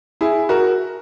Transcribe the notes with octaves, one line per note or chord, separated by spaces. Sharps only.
E4 G#4
F#4 A#4